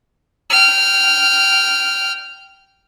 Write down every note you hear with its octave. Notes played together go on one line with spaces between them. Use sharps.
G5 F6